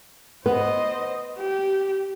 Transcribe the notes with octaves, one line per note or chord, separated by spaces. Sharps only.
B3 C5 D#5
G4